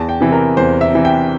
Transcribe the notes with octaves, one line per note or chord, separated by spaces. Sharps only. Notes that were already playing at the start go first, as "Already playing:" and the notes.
Already playing: E2 A5
G5
C3 E3
A#4
E2 C5
E5
C3 E3
G5